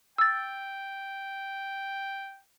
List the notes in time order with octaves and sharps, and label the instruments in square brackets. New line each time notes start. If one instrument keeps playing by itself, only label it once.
[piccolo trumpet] G5 [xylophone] E6 A6